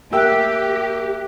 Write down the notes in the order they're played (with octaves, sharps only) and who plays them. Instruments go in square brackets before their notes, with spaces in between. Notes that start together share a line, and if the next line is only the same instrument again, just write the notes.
[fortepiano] A#3 G5 E6 [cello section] G4 [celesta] E5 F#6